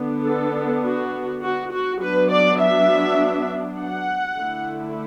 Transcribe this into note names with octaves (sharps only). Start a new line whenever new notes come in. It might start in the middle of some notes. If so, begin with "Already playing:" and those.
Already playing: D3 B3 D4
A4
F#4
F#4
F#4
F#3 B3 D4 B4
D5
E5
F#5
D3 A3 E4